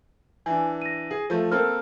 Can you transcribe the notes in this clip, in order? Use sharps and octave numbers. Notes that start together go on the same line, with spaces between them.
E3 D4 G#5
A#6 D#7
G#4
F3 A3
A#3 C4 A4 A#4 F6